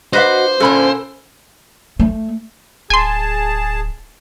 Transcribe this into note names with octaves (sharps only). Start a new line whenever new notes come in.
D4 F#4 B4 C5 D#5 F5 F#5
A#2 D3 C#4 A4 A#4 B5
A3
D1 G#4 G#5 A5 C6